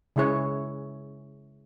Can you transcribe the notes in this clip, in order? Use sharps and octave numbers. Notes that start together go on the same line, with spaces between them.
C#3 G#3 E4 G#4 C#5